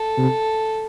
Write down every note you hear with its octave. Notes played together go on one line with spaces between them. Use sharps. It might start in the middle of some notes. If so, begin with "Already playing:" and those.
Already playing: A4
C3